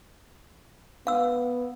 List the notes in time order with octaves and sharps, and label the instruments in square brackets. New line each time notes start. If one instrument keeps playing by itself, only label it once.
[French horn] B3 [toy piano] F5 E6